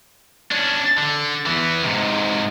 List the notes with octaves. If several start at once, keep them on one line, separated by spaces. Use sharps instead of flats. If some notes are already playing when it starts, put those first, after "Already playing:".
C#4 D4
D3
E3 B3
G#2 C3